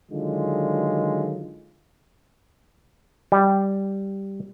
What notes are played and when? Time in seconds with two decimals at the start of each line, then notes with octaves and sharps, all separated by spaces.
0.11 D3 D#3 F#3 G#3 F4
3.32 G3